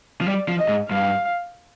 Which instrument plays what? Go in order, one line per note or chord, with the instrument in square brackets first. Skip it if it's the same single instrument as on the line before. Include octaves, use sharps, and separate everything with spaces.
[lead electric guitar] F3
[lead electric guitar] G3 [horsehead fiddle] D5
[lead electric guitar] F3
[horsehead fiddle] D#5
[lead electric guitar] G#2
[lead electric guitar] G2 [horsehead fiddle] F5